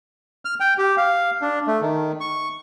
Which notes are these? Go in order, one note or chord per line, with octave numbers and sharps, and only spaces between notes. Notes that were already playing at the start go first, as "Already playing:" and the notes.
F6
G5
G4
F5
D4
A3
D#3
C#6